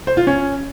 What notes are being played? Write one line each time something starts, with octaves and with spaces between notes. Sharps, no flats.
C5
F4
C#4